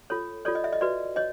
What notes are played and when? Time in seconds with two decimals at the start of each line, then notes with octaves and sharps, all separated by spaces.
0.10 F4 A4 C#5
0.45 F4 A4 C#5 D5
0.55 D#5
0.64 E5
0.73 D#5
0.81 F#4 B4 D5
1.16 C#5 D#5